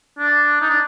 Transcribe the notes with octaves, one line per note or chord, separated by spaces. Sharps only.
D4
D#4
D4